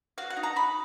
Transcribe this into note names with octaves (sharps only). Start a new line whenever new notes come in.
F#4 F5
F#5
D#4
A#5
D#4 B5